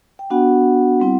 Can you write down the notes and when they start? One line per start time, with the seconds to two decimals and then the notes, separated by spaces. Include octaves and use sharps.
0.19 G5
0.30 B3 D4 F#4 F#5
1.00 G3 C4 E4